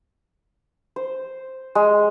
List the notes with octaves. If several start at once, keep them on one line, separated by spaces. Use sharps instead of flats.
C5
G#3